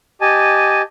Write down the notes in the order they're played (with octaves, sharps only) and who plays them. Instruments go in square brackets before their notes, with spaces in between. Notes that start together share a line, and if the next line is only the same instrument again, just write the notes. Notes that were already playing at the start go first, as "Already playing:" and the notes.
[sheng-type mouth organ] G4 D#5 G#5 A5